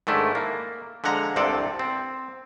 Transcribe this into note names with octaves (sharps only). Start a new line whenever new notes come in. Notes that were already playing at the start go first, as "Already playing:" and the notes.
G#2 D#3 A3 D4 E4
A#3
D3 F3 G#3 F#5 A#5
C2 G2 C3 C4 A4 D5
C4